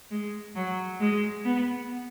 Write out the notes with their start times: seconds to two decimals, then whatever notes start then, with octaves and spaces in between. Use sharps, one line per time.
0.11 G#3
0.56 F#3
1.00 G#3
1.45 B3